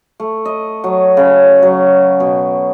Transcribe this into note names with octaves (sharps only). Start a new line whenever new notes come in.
A3
D#5
F#3
C#3
F#3
B2